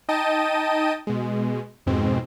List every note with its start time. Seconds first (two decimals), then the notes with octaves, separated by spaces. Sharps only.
0.08 D#4 D#5 G5 A5 D#7
1.07 B2 G#3
1.86 F2 G#2 B2 G#3 C4